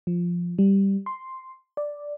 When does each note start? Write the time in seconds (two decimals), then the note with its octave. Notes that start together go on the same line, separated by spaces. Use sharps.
0.07 F3
0.59 G3
1.06 C6
1.77 D5